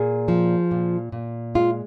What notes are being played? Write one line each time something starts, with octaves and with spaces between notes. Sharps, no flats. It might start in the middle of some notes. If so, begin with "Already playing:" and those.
Already playing: A#2 G#4
F3
A#2
A#2
G#3 F4